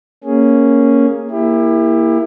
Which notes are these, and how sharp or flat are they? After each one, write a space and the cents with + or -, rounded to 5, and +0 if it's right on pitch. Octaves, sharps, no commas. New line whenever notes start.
A#3 +0 C#4 +0 G#4 +0
A#3 +0 E4 +0 G4 +35